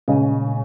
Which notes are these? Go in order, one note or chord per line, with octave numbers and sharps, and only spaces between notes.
A#2 C#3 G#3 C#4